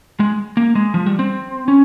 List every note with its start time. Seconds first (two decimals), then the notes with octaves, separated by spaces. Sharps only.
0.20 G#3
0.57 A#3
0.75 G#3
0.94 F3
1.06 G3
1.19 C4
1.68 C#4